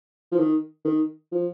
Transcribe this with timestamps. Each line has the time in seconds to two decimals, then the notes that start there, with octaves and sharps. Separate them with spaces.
0.32 F3
0.38 D#3
0.85 D#3
1.32 F3